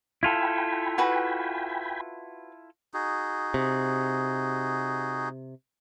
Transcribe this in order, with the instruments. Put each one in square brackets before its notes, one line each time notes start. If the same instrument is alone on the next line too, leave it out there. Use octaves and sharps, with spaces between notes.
[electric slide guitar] E4 F4 A4 [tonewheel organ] G5 G#5 B5
[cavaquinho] F#4 B4
[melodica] D#4 F#4 G#4
[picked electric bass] C3